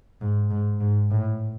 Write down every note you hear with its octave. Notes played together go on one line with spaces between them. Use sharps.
G#2
G#2
G#2
A2